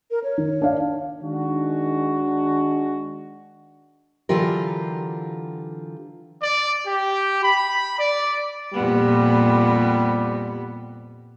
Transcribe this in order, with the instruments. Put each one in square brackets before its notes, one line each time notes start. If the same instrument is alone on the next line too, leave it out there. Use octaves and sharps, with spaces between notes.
[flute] A#4
C#5
[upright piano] D#3
D4 F5
[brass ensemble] D#3 G#3 D4 F#4
[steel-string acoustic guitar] D3 E3 F#3 F4 G4 A#4
[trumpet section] D5
G4
B5
D5
[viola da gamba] F2 A#2 B3 [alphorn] G3